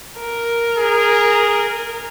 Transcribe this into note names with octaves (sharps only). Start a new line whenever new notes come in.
A#4
G#4